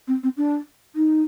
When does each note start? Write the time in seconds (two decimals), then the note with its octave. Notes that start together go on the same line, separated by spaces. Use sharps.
0.07 C4
0.23 C4
0.37 D4
0.95 D#4